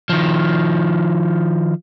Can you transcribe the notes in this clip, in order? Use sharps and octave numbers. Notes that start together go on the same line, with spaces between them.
D#3 F3